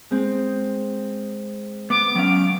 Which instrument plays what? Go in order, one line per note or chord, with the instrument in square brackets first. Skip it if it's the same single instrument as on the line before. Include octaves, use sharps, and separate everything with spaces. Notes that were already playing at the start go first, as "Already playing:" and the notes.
[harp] G#3 C4
[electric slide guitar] B3 [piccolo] D6
[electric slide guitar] F#3 C#4 F5 [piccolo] D7